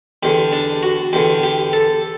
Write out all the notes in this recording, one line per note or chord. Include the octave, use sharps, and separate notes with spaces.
E2 D3 G4
D4
F#4
E2 D3 G4
G4
A4